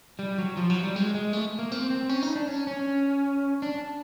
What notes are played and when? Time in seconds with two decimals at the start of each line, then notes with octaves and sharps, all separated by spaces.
0.19 G3
0.38 F#3
0.57 F3
0.70 F#3
0.83 G3
0.96 G#3
1.15 G#3
1.33 A3
1.59 A#3
1.72 C4
1.90 C4
2.09 C#4
2.23 D#4
2.36 D4
2.48 C#4
2.67 C#4
3.62 D4